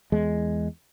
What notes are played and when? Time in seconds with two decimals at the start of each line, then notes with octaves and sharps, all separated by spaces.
0.12 E2 G#3